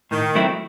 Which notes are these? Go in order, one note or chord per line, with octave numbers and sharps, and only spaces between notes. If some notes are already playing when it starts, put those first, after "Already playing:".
A2 D#3
F#3 A3 C4 E4